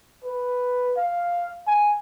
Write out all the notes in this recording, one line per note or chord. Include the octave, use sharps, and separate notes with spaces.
B4
F5
G#5